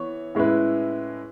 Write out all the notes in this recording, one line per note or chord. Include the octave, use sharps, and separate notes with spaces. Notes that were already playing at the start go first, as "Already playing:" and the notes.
Already playing: E3 B3 C#5
A2 G#3 C#4 E4 B4